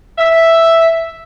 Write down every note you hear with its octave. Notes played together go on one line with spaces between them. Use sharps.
E5